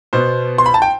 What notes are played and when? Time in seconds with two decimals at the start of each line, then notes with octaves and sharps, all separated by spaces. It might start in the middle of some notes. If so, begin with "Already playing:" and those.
0.13 B2 B3 C5
0.58 C6
0.66 B5
0.74 A5
0.82 G5